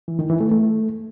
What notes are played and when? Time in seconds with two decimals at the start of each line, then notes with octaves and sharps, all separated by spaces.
0.08 E3
0.19 D#3
0.30 E3
0.41 A3
0.51 A3